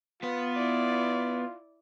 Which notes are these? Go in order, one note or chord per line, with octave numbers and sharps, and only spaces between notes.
B3 F4 B4
E4 D5